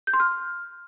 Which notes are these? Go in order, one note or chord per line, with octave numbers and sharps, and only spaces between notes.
G6
C6
F6